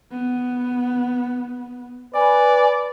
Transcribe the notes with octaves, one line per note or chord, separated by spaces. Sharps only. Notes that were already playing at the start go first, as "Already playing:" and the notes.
B3
B4 D5 G#5